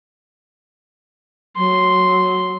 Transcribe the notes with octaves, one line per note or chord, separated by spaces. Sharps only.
F#3 C6